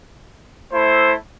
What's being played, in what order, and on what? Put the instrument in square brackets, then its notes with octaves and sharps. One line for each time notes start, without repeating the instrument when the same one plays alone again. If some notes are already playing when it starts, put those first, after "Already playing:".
[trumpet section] A3 E4 C5